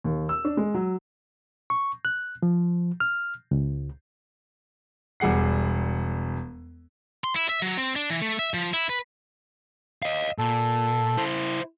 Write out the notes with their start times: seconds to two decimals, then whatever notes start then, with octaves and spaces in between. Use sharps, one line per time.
0.04 D#2
0.29 E6
0.45 D4
0.57 G#3
0.74 F#3
1.70 C#6
2.05 F#6
2.42 F3
3.00 F6
3.51 C#2
5.20 E1 G3 G#4 F#5 C7
7.24 C6
7.36 E4
7.49 E5
7.62 F#3
7.78 C4
7.96 D4
8.10 E3
8.22 A3
8.39 E5
8.54 F3
8.73 E4
8.89 B4
10.03 D#5 F5
10.38 A#2 A4
11.17 E4 C5